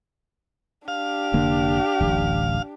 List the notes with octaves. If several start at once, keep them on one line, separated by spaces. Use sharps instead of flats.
D4 G4 F5
F1 D3 A#3
D1 A1